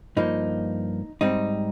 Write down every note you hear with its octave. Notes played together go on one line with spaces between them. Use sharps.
G2 F3 A#3 D#4
G#2 G3 C4 D#4